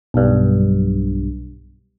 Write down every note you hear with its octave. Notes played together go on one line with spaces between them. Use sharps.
B1 G2